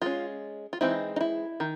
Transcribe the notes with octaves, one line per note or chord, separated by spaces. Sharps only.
G#3 C#4 F4
F4
E3 G#3 C4 D#4 E4
D#4
E4
D#3